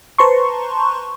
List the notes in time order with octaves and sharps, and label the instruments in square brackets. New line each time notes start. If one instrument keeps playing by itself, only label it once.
[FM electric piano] B4 C5 A5 A#5 C6 C#6